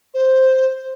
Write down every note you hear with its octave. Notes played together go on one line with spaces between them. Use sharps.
C5